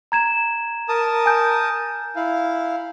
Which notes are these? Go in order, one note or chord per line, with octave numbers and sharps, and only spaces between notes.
A#5 G#6 E7
A#4 A5 D#6
G#5 G6
E4 F5